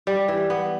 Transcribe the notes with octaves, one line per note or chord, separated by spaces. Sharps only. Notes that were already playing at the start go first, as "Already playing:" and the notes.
G3
E3
B3